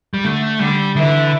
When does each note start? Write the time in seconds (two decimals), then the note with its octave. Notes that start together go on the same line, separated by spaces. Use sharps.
0.14 G3
0.24 D3 A3
0.59 D3 G3
0.95 D3 E3